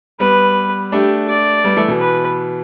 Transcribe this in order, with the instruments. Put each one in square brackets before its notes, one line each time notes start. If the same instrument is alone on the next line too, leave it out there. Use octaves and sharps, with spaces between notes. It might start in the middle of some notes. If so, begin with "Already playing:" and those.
[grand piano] G3 B3 [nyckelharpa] B4
[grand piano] A3 D4 [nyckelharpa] G4
[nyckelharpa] D5
[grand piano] G3 B3
E3 A3
B2 E3
[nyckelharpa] B4